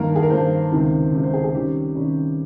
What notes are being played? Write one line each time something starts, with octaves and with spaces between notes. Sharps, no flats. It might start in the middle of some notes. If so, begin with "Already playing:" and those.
Already playing: G2 D#3 A#3 D#4 A#4
G#4
A#4
G2 D#3 A#3 D#4 C5
C#2 C3 D#3
C#2 C3 D#3
C5
G#4
G#4
C3 D#3 G3 C#4 G4
C3 D#3 G3 C#4